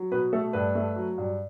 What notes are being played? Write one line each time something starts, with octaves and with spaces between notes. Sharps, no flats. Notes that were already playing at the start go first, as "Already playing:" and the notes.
Already playing: F#3
B2 B4
A3 A4
G2 B4
A3
F#3
G2